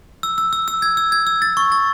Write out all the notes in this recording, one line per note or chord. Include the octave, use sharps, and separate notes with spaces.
E6
E6
E6
E6
G#6
E6
G#6
E6
A6
C#6
A6